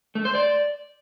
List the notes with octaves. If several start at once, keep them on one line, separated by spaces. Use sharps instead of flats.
A3
C5
D5